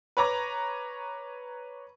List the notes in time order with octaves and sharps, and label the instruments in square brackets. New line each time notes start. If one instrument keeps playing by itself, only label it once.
[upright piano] B4 C#5 A#5 D6 A#6